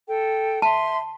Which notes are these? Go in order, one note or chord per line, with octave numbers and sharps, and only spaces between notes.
A4 G5
E5 A5 C6